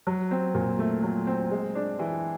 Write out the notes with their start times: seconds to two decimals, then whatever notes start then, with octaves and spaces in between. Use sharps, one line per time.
0.07 F#3
0.31 C4
0.54 A#2
0.79 A3
1.03 F#3
1.27 C4
1.51 G#3
1.75 D4
1.99 E3